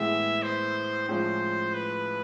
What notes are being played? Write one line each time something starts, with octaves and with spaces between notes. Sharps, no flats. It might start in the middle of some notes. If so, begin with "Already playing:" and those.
Already playing: A2 E3 G#3 B3 E4 E5
C5
A2 F3 G#3 C#4 F4 C5
B4